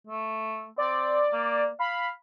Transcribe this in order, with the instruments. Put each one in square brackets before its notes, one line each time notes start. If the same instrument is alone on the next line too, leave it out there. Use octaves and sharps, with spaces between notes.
[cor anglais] A3
[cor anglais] C4 [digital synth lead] D5
[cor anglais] A#3
[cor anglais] F5 [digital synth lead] B5